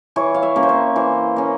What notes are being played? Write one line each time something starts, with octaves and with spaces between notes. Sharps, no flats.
E3 C#5
F5
E5
A#3 C#4
C5
C#5
E3 C5
A#3 C#4